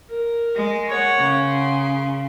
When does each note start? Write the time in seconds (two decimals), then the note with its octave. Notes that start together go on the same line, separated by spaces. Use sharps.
0.10 A#4
0.56 G#3
0.88 C#5 F#5
1.18 C#3
1.48 C6